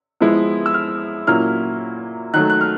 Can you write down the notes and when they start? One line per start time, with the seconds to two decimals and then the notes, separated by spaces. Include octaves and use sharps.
0.20 F3 G#3 B3 E4
0.66 E6
0.74 F6
1.27 A#2 F#3 A#3 C#4 E4 F6
2.34 D#3 F#3 A3 F#6
2.50 F#6
2.61 F6